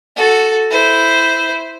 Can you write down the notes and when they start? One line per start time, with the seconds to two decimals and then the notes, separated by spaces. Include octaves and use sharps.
0.16 F#4 A4
0.72 E4 C5